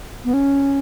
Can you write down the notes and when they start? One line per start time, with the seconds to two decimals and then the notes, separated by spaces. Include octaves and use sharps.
0.25 B3
0.34 C#4